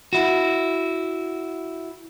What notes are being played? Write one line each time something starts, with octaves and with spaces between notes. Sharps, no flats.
E4 F#4